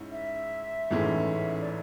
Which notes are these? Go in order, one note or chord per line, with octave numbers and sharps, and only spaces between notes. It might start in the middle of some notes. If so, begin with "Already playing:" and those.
Already playing: G#2 C#4 E4
E5
A1 G#2 E3 A3 C#4
D5